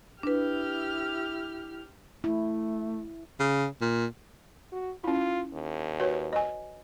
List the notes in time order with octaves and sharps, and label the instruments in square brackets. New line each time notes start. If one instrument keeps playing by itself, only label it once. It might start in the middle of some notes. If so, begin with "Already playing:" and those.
[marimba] D4 B4 [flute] E4 [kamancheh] G4 F6
[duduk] A3 [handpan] E4
[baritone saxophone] C#3
A#2
[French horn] F#4
[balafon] C#4 E4 [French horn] F4
[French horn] D#2
[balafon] F#4 B4 C#5
D#5 G#5